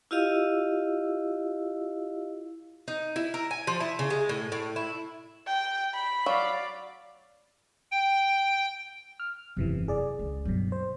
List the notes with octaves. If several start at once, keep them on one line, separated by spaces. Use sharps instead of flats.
E4 F4 G4 D#5 F5 E6
D#4
E4
A#4
G#5
F3
E4
C#3
G#3
A2
A2
E4
G5
B5
F#3 D5 F5
G5
F6
E1 F#2 C3 E3
G#4 D5
C#2
G2 B2 F#3 C4
C5